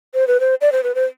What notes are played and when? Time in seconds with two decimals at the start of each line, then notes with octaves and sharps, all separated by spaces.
0.14 C5
0.27 B4
0.40 C5
0.61 D5
0.72 C5
0.83 B4
0.95 C5